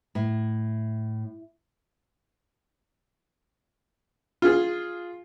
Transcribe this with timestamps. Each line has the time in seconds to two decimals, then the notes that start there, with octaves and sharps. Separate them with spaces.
0.15 A2
4.42 F4 G#4